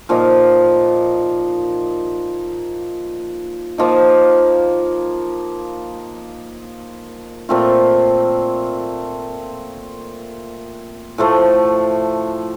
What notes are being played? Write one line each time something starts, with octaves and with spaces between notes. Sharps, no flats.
A#2 F3 A#3 D#4
F3 A#3 D#4
A#2 A3 C4 F4
A2 F3 A3